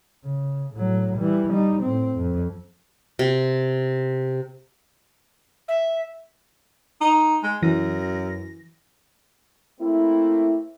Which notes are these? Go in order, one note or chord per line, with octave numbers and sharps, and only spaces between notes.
C#3
A2 F#3
E3 G3
G3 D#4
A2 C4
F2
C3
E5
D#4
G#3
F#2 E3 A#6
A3 A#3 C4 E4